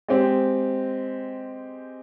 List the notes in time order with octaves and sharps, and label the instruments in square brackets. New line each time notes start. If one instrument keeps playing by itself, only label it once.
[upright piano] G#3 C4 G4